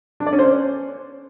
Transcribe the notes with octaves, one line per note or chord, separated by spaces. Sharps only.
D4
D5
C#4
C5
C#4